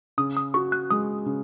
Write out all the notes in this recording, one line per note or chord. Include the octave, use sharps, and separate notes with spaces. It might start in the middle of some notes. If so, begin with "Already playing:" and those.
C#3 D#6
D#6
F#4 C#6
F#6
G#3 D#6
C#3